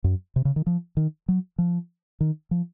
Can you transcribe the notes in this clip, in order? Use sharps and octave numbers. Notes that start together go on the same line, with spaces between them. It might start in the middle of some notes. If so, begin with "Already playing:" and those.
F#2
C3
C#3
D#3
F3
D#3
F#3
F3
D#3
F3